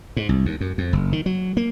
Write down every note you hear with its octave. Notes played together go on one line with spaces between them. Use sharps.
G#2
C2
D#2
F#2
F2
F#1
D#3
F#3
A#3